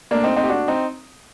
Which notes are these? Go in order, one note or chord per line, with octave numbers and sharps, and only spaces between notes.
A#2 A3 A#3 D4
C4 D#4
C4 D#4
G4
D4 F#4
C4 D#4